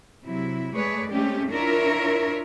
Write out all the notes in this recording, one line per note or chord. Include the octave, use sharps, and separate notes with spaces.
C3 F#3 E4
G#3 A3 G#4 B4 C#5 D5
G#3 A3 C4 C#4 G4
D4 E4 F4 A#4 C#5 E5